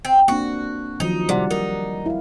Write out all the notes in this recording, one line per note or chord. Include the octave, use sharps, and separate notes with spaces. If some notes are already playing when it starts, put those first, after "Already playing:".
C4
A#3 C4 D4 F#4
D#3 F3 F#3 D#4
C3 G3 D5 F#5
D#4 A#4
E4 F5